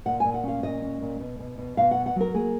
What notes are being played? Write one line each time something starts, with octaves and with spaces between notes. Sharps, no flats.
A#2 F#5
A#2 G#5
F#5
C#4 F5
A#2 D#5
C#4
A#2
B2
B2
B2
B2 F5
F#5
B3
F#5
F#3 A#4
A#3 G#4